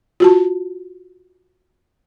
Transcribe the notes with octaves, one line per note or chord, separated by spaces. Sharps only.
F4 F#4 A5